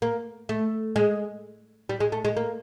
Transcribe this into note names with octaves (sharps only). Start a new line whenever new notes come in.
A#3
A3
G#3
G3
G#3
A3
G#3
A#3